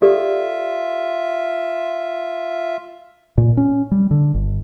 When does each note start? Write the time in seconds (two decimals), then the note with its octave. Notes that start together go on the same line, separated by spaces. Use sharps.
0.02 F4 G4 A4 D5 E5
3.38 A#2
3.57 C#4
3.92 G3
4.11 D3
4.34 G1